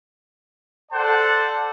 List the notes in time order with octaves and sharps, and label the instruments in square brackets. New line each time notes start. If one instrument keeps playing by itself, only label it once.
[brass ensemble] A4 C5 D5 F#5 A5